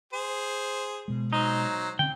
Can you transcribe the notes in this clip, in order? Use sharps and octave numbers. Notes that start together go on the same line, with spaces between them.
G#4 C5
B2 G#3
F#3 D#4 C5
D3 C4 C#4 G5